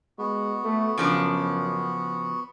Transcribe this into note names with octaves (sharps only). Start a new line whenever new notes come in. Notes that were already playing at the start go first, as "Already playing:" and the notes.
G#3 B3 F#4
A3
F#2 C#3 F3 D4